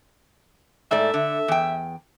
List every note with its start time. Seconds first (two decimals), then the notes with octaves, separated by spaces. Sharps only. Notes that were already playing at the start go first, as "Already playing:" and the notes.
0.91 G#2 A3 D5 E5
1.14 D3
1.48 E2 G5